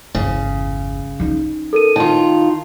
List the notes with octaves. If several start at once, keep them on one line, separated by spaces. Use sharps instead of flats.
G1 E2 C#3
C#4 D#4
A4 A#4 D#7
D#3 F4 A5